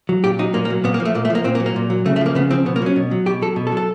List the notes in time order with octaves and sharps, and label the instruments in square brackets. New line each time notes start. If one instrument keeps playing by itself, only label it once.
[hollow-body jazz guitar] F#3
A#2 G4
F#3 D#4
A#2 A#3
A#3
F#3
A#2 B3
A#3
F3
A3
A#2 A#3
A3
F3
A#3
A#2 C4
A#3
F#3
A#3
A#2
F#3
C#3 A3
A3
F3 A#3
C#3 B3
F3 C4
B2 B3
A#3
F#3 C#4
B2
F#3
B2 G4
F#3 A4
B2
A4
F#3
A4